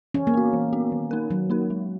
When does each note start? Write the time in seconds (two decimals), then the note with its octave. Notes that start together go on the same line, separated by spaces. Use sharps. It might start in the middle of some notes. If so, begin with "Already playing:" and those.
0.14 E3 C#4
0.27 A#3
0.34 B3 F#4
0.53 E3
0.73 B3 F#4
0.92 D#3
1.11 A#3 D#4 A#4
1.30 D#3 F#3
1.50 A#3 D#4 A#4
1.70 G#3